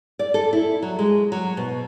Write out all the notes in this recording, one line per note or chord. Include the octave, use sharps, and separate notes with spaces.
D5
A4
E4
F#3
G#3
F#3
B2